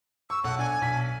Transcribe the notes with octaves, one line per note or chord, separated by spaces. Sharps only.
C#6 E6
B1 A4 F#5
D4 G#5
B1 B6